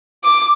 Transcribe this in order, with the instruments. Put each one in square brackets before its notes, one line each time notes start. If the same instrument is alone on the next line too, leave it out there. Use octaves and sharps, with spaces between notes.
[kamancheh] D6